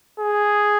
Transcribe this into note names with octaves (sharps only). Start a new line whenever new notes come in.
G#4